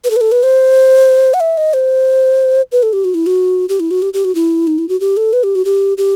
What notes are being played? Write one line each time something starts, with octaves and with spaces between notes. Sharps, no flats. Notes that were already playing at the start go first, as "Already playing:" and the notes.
B4
A4
B4
A4
B4
C5
F#5
E5
D#5
C5
B4
A4
G4
F#4
E4
F#4
G4
E4
F#4
G4
G4
F#4
E4
D#4
E4
F#4
G4
A4
B4
G4
F#4
G4
G4